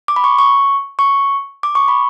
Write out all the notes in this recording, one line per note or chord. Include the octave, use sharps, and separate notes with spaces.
D6
B5
C#6
C#6
C#6
D6
C#6
B5